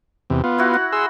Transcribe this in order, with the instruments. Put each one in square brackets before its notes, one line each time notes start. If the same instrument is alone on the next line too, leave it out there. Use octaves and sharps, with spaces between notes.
[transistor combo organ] E2 C3
B3 F4
[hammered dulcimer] E4 F#4
F#5
[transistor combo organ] G#4 C6 E6